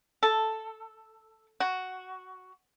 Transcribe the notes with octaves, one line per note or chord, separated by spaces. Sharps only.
A4
F#4